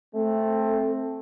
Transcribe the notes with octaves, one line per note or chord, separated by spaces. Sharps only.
A3 C4 A4